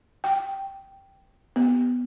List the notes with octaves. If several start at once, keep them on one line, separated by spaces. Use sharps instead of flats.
G5
B3